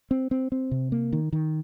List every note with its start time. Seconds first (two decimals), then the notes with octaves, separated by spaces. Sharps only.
0.11 C4
0.31 C4
0.52 C4
0.71 C3
0.92 A#3
1.12 D#3
1.33 D#3